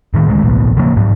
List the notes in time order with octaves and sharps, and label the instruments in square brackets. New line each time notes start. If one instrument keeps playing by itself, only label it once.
[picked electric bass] A2 D#3
D2 G#3
A1 B2
C#3 F3 A#3
G#2 F#3